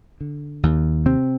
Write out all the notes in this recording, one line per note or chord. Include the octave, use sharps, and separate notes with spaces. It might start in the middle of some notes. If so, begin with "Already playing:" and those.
D3
D#2
C3 C4